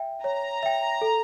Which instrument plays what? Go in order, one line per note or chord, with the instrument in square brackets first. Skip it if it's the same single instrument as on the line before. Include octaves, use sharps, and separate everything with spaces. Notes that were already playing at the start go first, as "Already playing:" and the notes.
Already playing: [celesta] E5 G5
[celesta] C#5 [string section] A#5
[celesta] E5 G5
A4